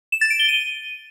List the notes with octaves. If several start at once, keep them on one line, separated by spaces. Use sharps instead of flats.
E7
A6
D7
G7
D#7